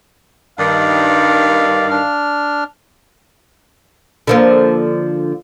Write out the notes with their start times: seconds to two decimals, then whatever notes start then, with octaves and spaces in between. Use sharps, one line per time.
0.59 G2 D#3 D5 F5
1.90 D4 F6
4.27 D3 F3 A#3